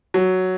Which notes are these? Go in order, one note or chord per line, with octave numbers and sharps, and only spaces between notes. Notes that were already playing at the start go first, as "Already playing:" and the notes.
F#3